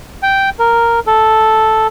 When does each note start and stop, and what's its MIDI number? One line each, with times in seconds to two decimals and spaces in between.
0.23 0.50 79
0.59 1.00 70
1.07 1.87 69